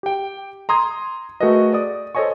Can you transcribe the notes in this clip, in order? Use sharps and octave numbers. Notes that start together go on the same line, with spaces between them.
G4 G5
A#5 C6 D#6 G#6
A3 F#4 G#4 A#4 B4 D#5
D5 D#6
A4 C5 C#5 D#5 G#5 C#6